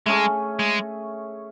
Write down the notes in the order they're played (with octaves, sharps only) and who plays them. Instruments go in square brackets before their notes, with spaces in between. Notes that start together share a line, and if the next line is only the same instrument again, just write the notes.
[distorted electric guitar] G#3 [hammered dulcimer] A3 C#4 G#4
[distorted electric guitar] G#3